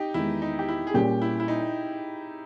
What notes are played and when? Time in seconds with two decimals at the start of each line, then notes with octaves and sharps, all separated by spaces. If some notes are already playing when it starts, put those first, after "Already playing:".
Already playing: D#4 G4
0.14 E2 D#3 G#3 B3 E4
0.42 D#4
0.59 G4
0.69 E4
0.87 G#4
0.94 A#2 G3 C#4 G4
1.22 E4
1.40 E4
1.48 D#4